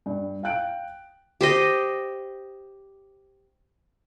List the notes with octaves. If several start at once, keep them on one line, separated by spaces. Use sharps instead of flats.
G2
F5 G5 F#6 D7
G4 C5 D#5